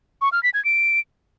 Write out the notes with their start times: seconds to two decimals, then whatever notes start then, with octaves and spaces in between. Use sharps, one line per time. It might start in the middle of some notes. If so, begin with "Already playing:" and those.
0.22 C#6
0.32 F6
0.43 B6
0.54 G#6
0.65 D7